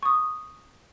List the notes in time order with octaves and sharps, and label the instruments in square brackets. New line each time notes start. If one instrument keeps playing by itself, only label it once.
[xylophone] C#6 D#6